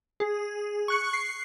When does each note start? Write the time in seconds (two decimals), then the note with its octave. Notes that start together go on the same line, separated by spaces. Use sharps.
0.20 G#4
0.88 C#6 F#6 C#7
1.13 C7